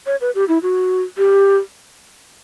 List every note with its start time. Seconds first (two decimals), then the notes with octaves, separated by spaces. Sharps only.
0.06 C#5
0.21 B4
0.35 G4
0.48 E4
0.63 F#4
1.18 G4